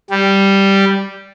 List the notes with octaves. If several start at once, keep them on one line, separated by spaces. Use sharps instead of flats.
G3